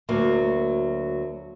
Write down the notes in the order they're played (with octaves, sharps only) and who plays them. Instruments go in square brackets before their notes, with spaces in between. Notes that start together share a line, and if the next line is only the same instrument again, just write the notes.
[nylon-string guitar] D2 F#3 A#3